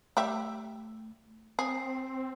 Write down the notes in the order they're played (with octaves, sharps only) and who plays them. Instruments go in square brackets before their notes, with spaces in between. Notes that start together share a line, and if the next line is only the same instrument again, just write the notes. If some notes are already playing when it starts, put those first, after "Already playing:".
[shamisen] G3 G4 E5 [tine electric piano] A3
[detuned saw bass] C4 [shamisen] G#4 [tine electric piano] C7